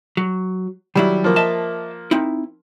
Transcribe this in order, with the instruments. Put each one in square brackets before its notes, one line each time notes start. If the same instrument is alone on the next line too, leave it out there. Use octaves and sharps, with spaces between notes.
[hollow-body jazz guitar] F#3
[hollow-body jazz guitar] D#3 F#3 E4 [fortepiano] G3
[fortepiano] F3 A#3
[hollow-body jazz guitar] D#5 E5 A5
C4 D#4 E4